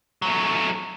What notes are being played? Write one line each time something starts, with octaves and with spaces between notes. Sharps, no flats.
F#3 A3